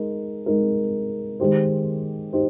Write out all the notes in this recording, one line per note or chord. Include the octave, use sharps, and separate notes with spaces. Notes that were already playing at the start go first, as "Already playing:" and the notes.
Already playing: G#3 D#4 A#4
G#3 D#4 A#4
D#3 G#3 D#4 G4 C5
D#4 G4 C5